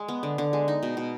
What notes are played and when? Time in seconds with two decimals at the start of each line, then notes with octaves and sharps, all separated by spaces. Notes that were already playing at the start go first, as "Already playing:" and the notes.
Already playing: G#3
0.08 B3
0.23 D3
0.38 D3
0.53 G#3
0.68 D#4
0.83 B2
0.97 B2